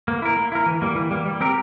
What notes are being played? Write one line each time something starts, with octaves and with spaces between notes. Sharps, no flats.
A#3
E4 A#4
A#3
E4 A#4
E3
G3 A#3
E3
G3 A#3
G3
C4 G4 A#4